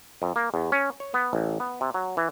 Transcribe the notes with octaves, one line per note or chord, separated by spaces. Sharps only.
F2
A#3
E2
C#4
C#5
B3
A1
B3
C3
F#3
E3